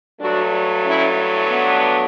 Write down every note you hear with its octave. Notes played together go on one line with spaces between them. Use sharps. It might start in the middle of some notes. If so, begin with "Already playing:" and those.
G2 F#3 A3 D4 F#4
C#4 E4
B3 D4